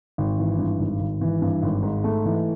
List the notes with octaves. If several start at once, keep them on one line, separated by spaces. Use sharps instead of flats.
G#1
E3
G2
G#1
G#1
E3
G2
G#1
G#2
A3
E3